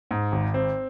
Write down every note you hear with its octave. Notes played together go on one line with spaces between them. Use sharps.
G#2
G#1
C4